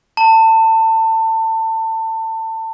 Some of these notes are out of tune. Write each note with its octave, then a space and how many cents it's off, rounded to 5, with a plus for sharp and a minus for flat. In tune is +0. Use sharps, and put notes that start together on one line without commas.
A5 +25